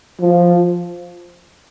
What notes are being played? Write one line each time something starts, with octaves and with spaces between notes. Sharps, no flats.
F3